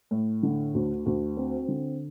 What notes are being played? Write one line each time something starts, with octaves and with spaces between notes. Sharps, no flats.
A2
D3
D2
D2
C4
D3